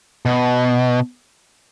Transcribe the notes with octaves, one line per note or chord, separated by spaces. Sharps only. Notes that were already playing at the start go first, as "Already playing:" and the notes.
B2